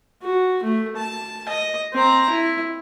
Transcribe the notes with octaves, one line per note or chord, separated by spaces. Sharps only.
F#4
A3
A5
D#5
C4 A#5
E4